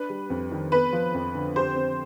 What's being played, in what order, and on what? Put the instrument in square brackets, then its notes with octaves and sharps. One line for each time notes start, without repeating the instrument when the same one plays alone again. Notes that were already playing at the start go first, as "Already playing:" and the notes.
Already playing: [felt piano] D4 [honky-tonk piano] B4
[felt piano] G3
F2
D#3
[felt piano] B3 [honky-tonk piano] B4
[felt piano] F3
F2
D3
[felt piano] G4 [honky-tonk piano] C5
[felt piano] C4